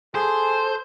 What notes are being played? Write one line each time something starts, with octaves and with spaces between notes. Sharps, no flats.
G#4 A4 C5